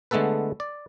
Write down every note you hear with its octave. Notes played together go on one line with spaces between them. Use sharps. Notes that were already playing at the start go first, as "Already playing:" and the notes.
D3 G#3 A3 B3 A4 B4
D5